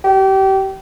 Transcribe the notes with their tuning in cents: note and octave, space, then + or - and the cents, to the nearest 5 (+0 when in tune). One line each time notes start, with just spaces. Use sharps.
G4 -30